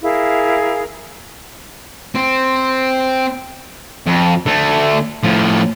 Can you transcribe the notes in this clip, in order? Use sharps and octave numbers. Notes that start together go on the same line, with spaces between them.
E4 G#4 A#4 F5
C4
F2
D3 A3
A2 F3